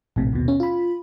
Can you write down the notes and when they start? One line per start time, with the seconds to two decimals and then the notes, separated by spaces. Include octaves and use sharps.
0.16 A#1 A2 C3
0.33 D#2 B2
0.48 C#4
0.60 F4 B5